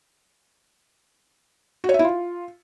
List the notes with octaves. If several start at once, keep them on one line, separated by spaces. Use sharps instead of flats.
F#4
C#5
E5
E4
F4